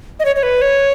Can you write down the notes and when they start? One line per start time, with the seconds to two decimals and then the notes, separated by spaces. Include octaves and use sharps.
0.19 D#5
0.25 C#5
0.36 C#5
0.43 B4
0.61 C#5